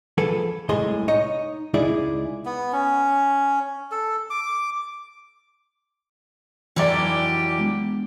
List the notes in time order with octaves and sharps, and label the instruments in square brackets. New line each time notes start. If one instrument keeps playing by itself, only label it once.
[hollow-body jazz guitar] F3 G#4 A4 B4
C2 A2 G#3 G#4 C6
D#4 C#5 D#5
C#2 G#3 D#4 E4 G#4 D5
[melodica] B3
C#4
A4
D6
[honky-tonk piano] F1 D5 [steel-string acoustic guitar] E3 F#3 [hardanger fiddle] G4
[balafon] G#3 B3 D4